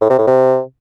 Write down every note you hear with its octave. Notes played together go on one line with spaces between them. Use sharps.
A2
C3
A2
C3